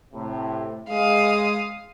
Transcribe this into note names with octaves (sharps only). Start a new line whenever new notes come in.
A2 C3
G#3 F5 D#6